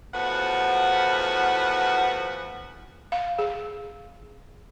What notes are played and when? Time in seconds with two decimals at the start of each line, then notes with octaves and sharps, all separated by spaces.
0.14 E2 A2 F3 F#4 B4 F#5
3.12 F5
3.39 G#4